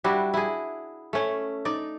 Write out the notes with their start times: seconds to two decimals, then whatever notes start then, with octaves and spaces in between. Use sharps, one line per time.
0.04 G3 D4 E4 F#4
0.34 E4 G#4
1.13 A3 C#4
1.65 D#4 D5